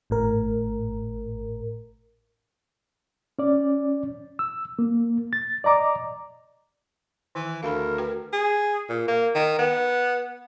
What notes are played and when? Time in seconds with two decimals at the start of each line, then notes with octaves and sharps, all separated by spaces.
0.10 G#1 A2 A#4
3.39 C#4 D5
4.39 E6
4.79 A#3
5.33 A6
5.64 D5 D#5 A#5 D6
7.35 D#3 E3
7.63 D2 A#4 F5 B5
7.98 F#4 B4 G5
8.33 G#4
8.89 A#2
9.08 A#3
9.35 D#3
9.59 B3